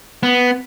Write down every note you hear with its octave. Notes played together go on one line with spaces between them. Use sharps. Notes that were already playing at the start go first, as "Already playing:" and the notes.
B3